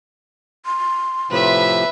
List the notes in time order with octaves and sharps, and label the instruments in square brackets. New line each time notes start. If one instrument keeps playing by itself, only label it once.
[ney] C6
[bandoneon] A2 C3 F3 [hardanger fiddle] B4 E5